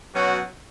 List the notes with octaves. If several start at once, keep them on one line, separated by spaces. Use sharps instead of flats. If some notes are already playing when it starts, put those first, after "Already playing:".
B2 F#3 C#4 F#4